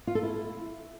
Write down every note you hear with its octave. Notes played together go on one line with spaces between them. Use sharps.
F4
A4
E4